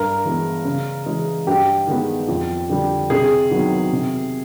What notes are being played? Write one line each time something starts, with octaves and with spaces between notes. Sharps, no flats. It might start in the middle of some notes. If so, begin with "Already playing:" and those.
Already playing: G2 A#4
E3 G#3 B3
C#3
E3 G#3
G2 G4
D#3 G#3 B3
F2
D3 G3
C3 G#4
D#3 F#3 B3
C3